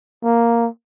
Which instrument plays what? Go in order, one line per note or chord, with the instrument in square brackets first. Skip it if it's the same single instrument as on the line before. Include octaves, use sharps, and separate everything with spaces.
[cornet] A#3